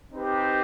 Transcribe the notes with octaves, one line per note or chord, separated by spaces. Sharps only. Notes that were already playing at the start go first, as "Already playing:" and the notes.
C4 D#4 G4 B4